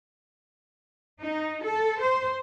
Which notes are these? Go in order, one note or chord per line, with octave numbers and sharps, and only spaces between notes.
D#4
A4
C5